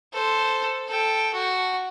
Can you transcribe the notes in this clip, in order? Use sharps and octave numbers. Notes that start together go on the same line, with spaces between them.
A4 C5
A4 G5
F#4